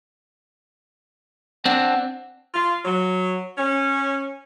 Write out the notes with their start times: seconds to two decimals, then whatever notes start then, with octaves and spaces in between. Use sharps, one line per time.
1.65 C4 D4 F#5
2.54 F4
2.85 F#3
3.57 C#4